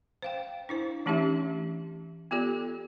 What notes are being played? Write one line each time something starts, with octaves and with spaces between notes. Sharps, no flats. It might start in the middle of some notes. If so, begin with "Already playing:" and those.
C5 F5 G5
D4 E4 C5
E3 A3 C#4 D#4 G4 E5
B3 F4 G4 A4 D5